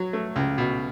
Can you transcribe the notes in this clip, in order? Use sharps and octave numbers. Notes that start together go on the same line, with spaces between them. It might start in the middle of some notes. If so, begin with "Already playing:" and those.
Already playing: F#3
A3
C#2
B2